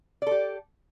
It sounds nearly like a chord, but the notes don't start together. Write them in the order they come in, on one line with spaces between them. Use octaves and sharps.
D5 A4 G4